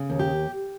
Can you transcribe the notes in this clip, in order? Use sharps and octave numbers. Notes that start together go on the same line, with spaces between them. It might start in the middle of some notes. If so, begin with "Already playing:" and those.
Already playing: C#3
D#2
G4